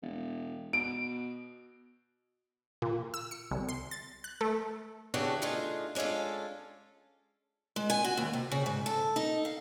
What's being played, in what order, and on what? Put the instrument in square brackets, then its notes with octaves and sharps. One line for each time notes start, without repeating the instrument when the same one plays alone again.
[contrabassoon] E1
[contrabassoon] B2 [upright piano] D7
[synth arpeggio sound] A#2
E6
C#7
C2
C6
A6
F#6
A3
[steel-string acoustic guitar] C#3 E3 D4 F#4 G4 A4
A3 D4 D#4 F4 G#4
G#3 C#4 D4 F4 A4
G#3
G#5
F#4
D#2
C3
C#3
G#2
A4
D#4
F5